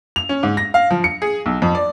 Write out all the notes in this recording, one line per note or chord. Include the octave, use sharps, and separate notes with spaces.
F7
C#4
G#2
A#6
F5
F3
C#7
G#4
B1
F2
D5